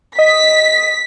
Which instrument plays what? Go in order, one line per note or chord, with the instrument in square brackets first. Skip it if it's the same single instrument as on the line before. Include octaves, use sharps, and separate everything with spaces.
[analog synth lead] D#5 [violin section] B6